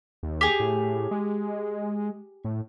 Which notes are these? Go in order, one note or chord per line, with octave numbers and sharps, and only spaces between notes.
D#2
G4 G#4
A2
G#3
A2